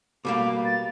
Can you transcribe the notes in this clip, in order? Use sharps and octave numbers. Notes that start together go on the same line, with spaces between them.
B2 G3 A#3 D6
A6